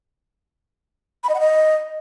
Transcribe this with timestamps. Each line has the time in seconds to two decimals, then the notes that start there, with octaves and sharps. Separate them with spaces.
1.23 B5
1.29 D#5
1.34 F#5
1.40 D#5